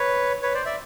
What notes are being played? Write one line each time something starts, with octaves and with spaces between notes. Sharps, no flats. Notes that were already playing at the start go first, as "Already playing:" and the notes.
Already playing: B4 C#5
B4 C#5
C5 D5
D5 E5